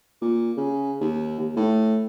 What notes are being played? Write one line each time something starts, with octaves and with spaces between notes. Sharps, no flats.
A#2
C#3
D#2
D#2
A2